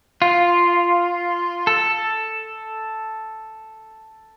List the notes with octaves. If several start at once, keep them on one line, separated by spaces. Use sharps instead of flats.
F4
A4